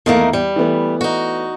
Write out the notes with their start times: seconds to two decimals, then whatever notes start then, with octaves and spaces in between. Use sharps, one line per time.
0.06 E2 D#3 A3 A#3 E4
0.33 G3
0.56 E3 A3 B3
1.01 D#4 F#4